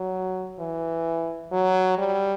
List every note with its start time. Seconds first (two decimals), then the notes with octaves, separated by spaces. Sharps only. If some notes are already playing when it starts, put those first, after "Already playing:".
Already playing: F#3
0.60 E3
1.52 F#3
1.98 G3